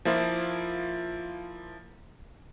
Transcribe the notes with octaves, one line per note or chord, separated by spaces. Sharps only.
F3 A#3 E4 F4